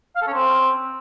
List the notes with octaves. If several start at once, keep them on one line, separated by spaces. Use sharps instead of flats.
F5
A4
C#4
C4